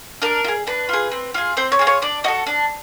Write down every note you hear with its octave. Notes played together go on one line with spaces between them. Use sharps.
D4 A#4
F4
G#4
D4 B4
F4 G#4
C4
F4 G#4
C4 C5
C#5
F4 G#4
C#5
D4 D5
F#4 A4 D#5
D4